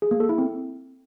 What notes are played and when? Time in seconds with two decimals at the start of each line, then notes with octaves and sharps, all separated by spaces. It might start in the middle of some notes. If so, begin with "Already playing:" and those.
0.02 G#4
0.11 A#3
0.20 A4
0.29 E4
0.38 C4